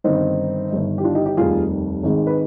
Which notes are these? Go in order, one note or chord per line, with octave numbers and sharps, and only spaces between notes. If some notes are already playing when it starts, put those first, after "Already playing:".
G1 G2 D#3 C4 D#4
G1 G2 D#3
G4
D4 F4
D#4 G4
D#4 G4
F1 D#2 D#3 G3 F4 G#4
G#1 G#2 D#3 G#3
B4